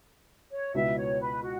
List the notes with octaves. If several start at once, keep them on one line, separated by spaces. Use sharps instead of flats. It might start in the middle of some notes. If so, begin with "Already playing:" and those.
C#5
C#2 B2 B3 E4 E5
C#5
B4
F#4